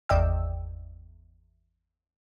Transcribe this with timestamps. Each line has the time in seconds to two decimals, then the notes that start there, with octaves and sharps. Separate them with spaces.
0.09 G#1 E2 D5 D#5 G5 E6